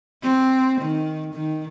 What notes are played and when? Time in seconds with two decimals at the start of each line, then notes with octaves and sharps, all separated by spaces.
0.23 C4
0.82 D#3
1.35 D#3